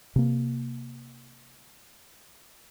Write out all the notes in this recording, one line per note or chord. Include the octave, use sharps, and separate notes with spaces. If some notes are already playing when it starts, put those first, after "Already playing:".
C3 A#3